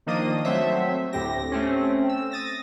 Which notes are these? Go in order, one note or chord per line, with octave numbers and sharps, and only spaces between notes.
D#3 F3 A#3 D4 D#5 D#6
F#3 A3 C4 C5 C#5 E5
D2 A2 C4 G4 A#6
A3 C4 C#4
E6
D#6 A6 A#6